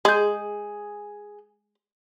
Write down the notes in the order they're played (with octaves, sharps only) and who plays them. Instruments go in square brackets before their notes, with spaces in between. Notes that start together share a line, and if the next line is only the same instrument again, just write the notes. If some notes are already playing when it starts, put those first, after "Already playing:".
[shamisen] G#3 [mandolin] G#4 G6